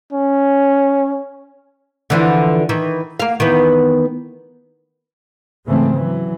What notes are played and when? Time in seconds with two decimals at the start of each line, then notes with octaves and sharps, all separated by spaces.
0.13 C#4
2.10 D3 E3 F3
2.69 D#3 E3
3.20 A#3 F5
3.40 D#3 E3 B3
5.66 G#2 C#3 E3 A3 C4
5.96 E3 F#3